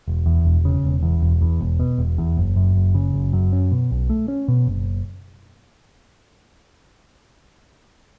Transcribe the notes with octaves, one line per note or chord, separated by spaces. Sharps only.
E1
E2
E1
C#3
E1
E2
E1
E2
E1
B2
E1
E2
F#1
F#2
F#1
C#3
F#1
F#2
C#4
B2
B1
A3
C#4
B2
F#1